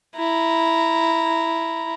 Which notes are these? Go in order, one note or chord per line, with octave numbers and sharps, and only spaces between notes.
E4 A#5